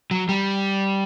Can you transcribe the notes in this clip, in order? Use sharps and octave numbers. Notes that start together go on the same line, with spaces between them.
F#3
G3